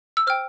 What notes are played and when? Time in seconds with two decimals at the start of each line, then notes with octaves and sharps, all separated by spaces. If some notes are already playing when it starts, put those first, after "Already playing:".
0.17 E6
0.27 C5 G5 F6